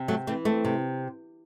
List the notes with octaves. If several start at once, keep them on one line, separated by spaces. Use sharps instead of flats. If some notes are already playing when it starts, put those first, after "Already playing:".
Already playing: C3
F#3 A3
E3 A3 C4
A3 C4
C3